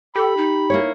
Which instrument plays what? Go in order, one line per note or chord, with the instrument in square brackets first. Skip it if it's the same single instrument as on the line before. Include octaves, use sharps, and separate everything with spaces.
[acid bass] G4 [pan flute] A4 [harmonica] B5
[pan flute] D#4
[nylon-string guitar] A#3 E4 C#5